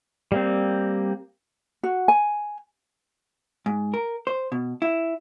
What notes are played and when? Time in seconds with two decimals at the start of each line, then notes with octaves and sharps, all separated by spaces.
0.32 G3 A#3 C4
1.83 F#4
2.08 G#5
3.66 G#2
3.94 A#4
4.27 C5
4.52 B2
4.82 E4